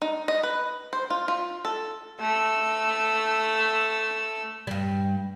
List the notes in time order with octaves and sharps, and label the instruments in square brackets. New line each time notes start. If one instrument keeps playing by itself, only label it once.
[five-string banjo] D#4
D#5
B4
C5
F4
F4
A4
[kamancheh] A3 E6
[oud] G2 G3